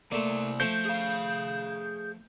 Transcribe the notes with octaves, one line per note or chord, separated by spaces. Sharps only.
C3 A3 A#3 D5
F3 A3 G6
G#4 F5